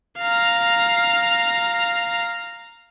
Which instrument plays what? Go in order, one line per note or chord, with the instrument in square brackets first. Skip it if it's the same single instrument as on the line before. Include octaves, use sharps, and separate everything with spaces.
[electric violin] F5 A#5